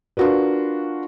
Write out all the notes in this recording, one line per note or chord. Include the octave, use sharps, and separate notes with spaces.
D4 F4 F#4 A#4 B4